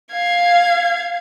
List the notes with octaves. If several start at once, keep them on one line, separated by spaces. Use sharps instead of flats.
F5 G#6